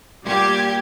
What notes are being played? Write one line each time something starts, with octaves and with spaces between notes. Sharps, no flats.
A#2 G3 G4 G#6